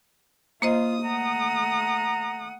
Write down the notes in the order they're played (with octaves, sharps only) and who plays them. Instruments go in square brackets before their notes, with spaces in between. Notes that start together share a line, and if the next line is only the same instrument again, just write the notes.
[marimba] A#3 C5 D#5 [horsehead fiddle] F4 [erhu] D#6
[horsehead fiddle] A3 F#5 [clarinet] A#5